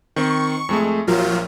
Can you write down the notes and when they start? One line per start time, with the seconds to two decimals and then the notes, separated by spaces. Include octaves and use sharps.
0.16 D#3 C4 C#6
0.69 F2 G#3 A3
1.07 A#1 F3 F#3 F4 A#4